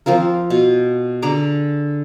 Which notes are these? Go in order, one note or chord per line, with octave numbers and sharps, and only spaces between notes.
F3 C4 F4 A#4
B2
D3 G#4 A#5 D6